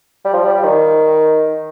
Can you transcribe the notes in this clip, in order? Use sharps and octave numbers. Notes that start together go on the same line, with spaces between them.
G3
F3
G3
G3
D#3